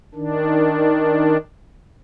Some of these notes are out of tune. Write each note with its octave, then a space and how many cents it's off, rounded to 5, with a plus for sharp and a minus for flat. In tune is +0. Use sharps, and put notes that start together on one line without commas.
D#3 +0 D4 +0